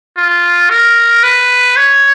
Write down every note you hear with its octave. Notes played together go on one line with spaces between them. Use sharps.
F4
A#4
B4
C#5